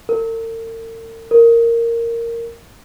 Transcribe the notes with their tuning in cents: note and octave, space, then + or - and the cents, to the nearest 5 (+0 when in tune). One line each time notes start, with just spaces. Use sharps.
A#4 -45
A#4 -10